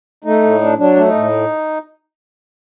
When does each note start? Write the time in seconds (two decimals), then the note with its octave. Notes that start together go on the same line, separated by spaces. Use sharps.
0.24 A3 D#4
0.43 A2
0.61 D4
0.78 F#3 D4
0.96 A3
1.06 D#4
1.14 A2